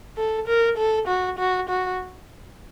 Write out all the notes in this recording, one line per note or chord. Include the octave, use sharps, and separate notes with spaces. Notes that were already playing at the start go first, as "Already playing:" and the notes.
A4
A#4
A4
F#4
F#4
F#4